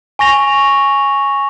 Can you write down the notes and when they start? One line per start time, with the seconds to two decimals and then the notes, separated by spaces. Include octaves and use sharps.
0.19 G#5 C#6 A#6 F7